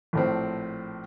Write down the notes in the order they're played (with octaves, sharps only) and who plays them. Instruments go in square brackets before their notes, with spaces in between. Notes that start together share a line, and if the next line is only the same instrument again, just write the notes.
[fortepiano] A#1 A2 C4